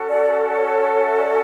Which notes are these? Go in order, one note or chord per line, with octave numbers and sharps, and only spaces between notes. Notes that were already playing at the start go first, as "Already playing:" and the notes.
Already playing: C#4 F#4 A4
D5
C#5
C#5
E5
D5